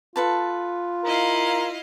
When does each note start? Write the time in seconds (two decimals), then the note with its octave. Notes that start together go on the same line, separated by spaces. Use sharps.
0.16 F4 A4 B4 A5
1.04 E4 A#4 D#5 F5